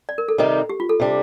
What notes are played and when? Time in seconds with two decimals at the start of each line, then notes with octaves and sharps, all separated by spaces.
0.09 D5
0.18 A#4
0.28 A4
0.38 C3 D#3 G3 C4 D#4
0.70 G4
0.80 F4
0.89 A4
1.00 C3 G3 D4